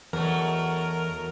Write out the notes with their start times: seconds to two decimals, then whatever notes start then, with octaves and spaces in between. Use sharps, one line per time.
0.13 E2 B2 F#3 A3 A#4